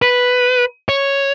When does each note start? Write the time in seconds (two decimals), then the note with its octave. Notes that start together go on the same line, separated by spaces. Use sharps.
0.02 B4
0.89 C#5